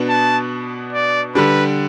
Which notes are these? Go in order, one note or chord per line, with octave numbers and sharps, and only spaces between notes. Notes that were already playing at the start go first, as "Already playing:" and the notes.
Already playing: B2 B3 D4
A5
D5
D3 G3 D4 B4